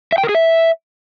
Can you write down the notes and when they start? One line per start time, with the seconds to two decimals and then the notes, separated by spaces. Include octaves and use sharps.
0.12 E5
0.18 G5
0.24 A#4
0.29 G#4
0.35 E5